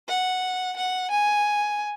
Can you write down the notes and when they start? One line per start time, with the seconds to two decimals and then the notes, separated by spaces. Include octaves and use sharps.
0.08 F#5
0.76 F#5
1.11 G#5